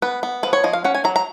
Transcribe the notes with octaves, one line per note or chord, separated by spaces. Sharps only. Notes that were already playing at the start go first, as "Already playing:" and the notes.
B3 B4
B3
F3 B4
C#5
F3 D#5
F5
C#4 F#5
G#5
F#3 A#5
A#5